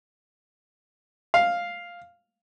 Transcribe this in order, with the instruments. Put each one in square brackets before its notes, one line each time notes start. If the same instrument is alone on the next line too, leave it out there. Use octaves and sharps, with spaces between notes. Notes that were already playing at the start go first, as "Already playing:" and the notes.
[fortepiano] F5